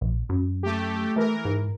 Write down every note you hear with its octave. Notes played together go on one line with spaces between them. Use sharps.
A#1
F#2
A3 G4
E3 A3 A#4
G#2